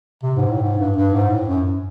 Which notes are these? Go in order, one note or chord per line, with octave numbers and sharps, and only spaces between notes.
C3
G#2
A2
G#2
G2
G2
G#2
A2
F#2